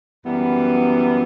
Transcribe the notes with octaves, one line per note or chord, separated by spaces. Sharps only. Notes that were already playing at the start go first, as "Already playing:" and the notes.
F#2 E3 G3 B3